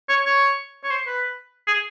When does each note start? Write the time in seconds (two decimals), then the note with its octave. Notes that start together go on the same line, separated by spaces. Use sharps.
0.09 C#5
0.25 C#5
0.84 C#5
0.91 C5
1.07 B4
1.67 G#4